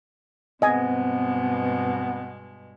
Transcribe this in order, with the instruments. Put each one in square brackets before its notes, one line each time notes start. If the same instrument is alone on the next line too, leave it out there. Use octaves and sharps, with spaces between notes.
[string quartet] G2 B2 G#3 [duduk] B3 [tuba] C4 [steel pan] D#5 G#5